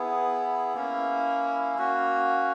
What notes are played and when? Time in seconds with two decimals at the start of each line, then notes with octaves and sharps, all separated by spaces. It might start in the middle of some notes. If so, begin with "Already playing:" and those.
Already playing: B3 E4 G#4
0.74 A#3 C#4 E4
1.78 A#3 C#4 F#4